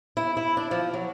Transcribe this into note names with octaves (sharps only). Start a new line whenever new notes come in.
E4
E4
D4
F3
F#3